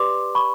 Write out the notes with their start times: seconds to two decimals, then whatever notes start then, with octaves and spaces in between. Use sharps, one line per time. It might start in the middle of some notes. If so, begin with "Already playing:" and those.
Already playing: G4 B4 D5 C6 D6
0.35 B5 C#6